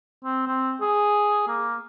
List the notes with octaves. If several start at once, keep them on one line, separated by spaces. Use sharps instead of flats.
C4
C4
G#4
A#3